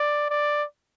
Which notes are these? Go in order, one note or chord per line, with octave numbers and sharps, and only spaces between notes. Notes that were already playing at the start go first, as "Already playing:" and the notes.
Already playing: D5
D5